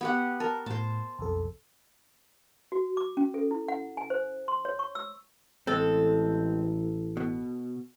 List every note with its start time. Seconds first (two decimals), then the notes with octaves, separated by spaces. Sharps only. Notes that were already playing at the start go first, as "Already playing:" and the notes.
0.01 B3 G4 F#5
0.40 A#4 A5
0.66 A2 C5 A5
1.19 B1 F2 A4
2.72 F#4
2.97 D6
3.17 C#4
3.34 A4
3.51 E4
3.68 F#5
3.97 G#5
4.10 C5
4.48 C6
4.65 C#5
4.79 C#6
4.95 E6
5.67 A1 G#3 C4 A4
7.17 B2